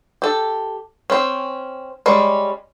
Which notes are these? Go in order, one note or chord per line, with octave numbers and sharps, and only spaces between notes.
G4 A4
C4 C#4
G3 G#3 C#4